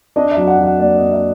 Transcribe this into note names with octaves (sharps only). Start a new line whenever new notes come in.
D4 D#5
E5
F#3
F#5
F#3
F#5
A#3 D5
D#5
D4
E5